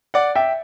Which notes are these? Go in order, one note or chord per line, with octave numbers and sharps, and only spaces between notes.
D5 F#5
E5 G5